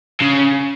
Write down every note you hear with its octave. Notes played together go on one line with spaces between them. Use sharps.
C#3